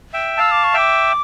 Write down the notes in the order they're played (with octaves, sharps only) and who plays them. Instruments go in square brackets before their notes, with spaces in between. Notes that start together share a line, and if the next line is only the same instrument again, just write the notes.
[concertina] E5 G5
[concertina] F5 A5 [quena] E6
[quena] D6
C#6
[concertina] E5 G5 [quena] D6